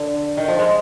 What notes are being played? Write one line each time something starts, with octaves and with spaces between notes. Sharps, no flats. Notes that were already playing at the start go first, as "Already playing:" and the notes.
Already playing: D3
D#3
F3
G#3